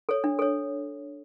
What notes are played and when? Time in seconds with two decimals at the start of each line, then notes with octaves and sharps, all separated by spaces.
0.09 A4 C#5
0.24 D4
0.39 A4 C#5